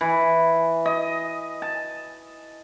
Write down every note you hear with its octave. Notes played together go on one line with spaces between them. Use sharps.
E3
D#5
A5